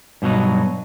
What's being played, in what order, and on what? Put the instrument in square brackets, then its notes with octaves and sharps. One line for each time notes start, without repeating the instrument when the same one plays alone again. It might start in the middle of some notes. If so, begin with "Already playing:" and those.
[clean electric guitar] G2 B2 D#3 F#3 D#4